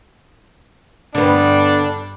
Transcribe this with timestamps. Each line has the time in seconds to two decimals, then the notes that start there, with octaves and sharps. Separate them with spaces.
1.15 G2 D3 G3 B3 D4 D5